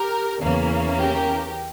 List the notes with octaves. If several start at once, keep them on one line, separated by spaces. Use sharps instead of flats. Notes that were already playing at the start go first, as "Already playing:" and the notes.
Already playing: G4 A#4
E2 C#3 E3 A#3 C#4
G4 A#4